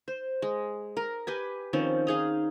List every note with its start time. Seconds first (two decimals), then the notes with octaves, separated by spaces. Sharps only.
0.08 C5
0.42 G#3
0.97 A#4
1.27 G4 B4 G#5
1.73 D#3 F3 C4 C#4
2.07 D#4 G#4 F5